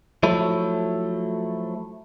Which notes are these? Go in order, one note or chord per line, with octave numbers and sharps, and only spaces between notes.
F3 F#3 A3 E4